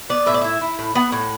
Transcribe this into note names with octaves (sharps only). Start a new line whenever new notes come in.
B3 D5
A2 E5
D5
E4 E5
E4
A2
B3 F#5
A2